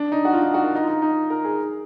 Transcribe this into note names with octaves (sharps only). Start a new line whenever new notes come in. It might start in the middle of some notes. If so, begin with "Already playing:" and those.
Already playing: D4
D#4
F#4
F4
D#4
F#4
A#4
D#4
F4
D#4
D#4
A#4
G#4